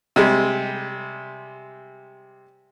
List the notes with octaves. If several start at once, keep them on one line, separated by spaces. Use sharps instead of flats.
C3 G3 G#3